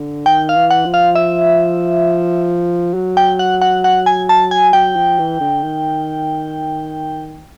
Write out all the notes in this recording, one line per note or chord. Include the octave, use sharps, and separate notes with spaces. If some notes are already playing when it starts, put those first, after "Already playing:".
Already playing: D3
D#3 G5
F5
E3
F#5
F3
F5
E5
F#3
G5
F#5
F#5
F#5
G#5
A5
G#5
F#3 G5
F3
E3
D3
D#3